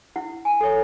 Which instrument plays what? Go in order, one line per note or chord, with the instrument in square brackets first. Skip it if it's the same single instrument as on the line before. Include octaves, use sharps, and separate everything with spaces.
[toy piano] E4 F#5
G#5
A4 C#5